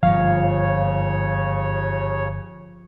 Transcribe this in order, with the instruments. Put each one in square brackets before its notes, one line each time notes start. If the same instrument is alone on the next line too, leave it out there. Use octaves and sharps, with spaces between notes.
[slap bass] G1 G#2 [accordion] D#2 C#3 C#5 [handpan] F3 [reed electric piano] F5